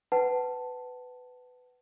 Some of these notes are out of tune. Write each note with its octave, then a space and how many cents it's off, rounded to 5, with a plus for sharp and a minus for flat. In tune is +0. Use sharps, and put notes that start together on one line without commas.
B4 +15 F#5 +30 A5 +0